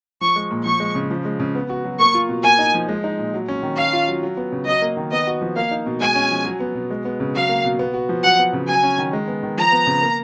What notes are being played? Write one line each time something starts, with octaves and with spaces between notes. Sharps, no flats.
F3 C#6
G#3
A#2
F3 C#6
G#3
C#3
F3
G#3
C#3
B3
F#4
F#3
A#3 C#6
F4
B2
A#3 G#5
D#4
F3
G#3
D#4
A#2
F#3
C#4
D#3
C#4 F5
F4
F#3
F#3
B3
C#3
F#3 D#5
A#3
D#3
B3 D#5
F#4
F3
A#3 F5
D#4
B2
G#3 G#5
C#4
F3
F#3
B3
B2
G#3
B3
C#3
F#3 F5
A#3
B2
B3
F#4
F3
F#3 F#5
B3
C#3
F#3 G#5
C#4
D#3
G#3
B3
D#3
F3 A#5
B3
C#3
A#3